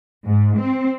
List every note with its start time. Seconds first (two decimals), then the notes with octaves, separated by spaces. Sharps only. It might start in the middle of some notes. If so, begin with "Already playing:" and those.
0.25 G#2
0.58 C4